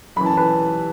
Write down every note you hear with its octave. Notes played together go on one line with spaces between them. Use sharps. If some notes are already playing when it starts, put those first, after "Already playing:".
F#2 E3 B5
A5
B4 B5